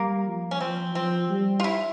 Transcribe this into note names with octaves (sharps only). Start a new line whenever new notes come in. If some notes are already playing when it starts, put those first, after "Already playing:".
Already playing: G3 A#3
F3
C#4
F3 C4
F3 C4
G3
F4
E4